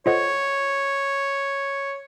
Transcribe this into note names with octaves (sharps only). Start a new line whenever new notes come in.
F4 A4 C5 C#5 D#5 F#5